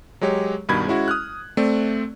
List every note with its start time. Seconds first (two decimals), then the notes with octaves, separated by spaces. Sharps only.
0.21 F#3 G#3 G4 C#5
0.69 G2 B2 D#3 B5 G#6
0.86 G#3 C#4 E4 F#4
1.08 D#6 F6 F#6
1.57 A3 C4 D5